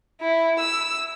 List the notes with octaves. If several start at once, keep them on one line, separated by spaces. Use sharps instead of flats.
E4
E6